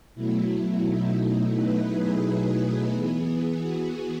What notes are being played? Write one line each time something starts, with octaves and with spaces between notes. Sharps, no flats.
B2 F#3 A3 E4
D#4
E4
B4
G#4
E3 B3
F#4